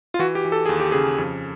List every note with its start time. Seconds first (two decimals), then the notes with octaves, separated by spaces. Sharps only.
0.14 F4
0.19 E3 F#4
0.35 G4
0.45 E3
0.52 A4
0.66 D#2 G#4
0.80 G4
0.92 C#3 G#4
1.18 F2